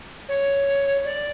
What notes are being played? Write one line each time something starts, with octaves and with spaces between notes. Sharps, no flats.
C#5
D5